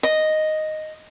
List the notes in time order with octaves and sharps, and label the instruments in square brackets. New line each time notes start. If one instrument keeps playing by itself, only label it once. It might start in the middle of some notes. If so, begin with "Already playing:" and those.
[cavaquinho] D#5